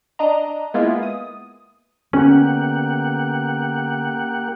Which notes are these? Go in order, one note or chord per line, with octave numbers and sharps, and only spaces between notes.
D4 D#5 A#5
G#3 A#3 B3 E4 F4
D#6
D3 A#3 B3 C#4 G4 F#5